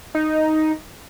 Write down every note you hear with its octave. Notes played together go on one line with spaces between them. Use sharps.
D#4